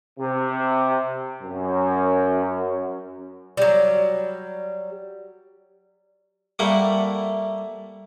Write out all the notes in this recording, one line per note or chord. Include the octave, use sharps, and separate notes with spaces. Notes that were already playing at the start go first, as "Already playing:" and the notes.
C3
F#2
F#3 G3
G3 A3 A#3 E4 F#5